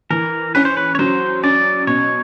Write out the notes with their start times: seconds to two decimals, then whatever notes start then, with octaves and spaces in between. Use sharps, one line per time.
0.10 E3 A#4
0.55 C#4 B4
0.65 C5
0.77 B4
0.95 C#5
0.99 F#3 C5
1.43 C#4 D5
1.87 B2 C#5